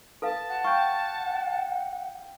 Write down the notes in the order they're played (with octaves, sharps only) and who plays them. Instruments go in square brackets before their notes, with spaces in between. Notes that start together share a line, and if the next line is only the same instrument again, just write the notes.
[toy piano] A4 B4 F5 [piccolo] A5
[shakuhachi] F#5
[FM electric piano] F5 G5 [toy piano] C#6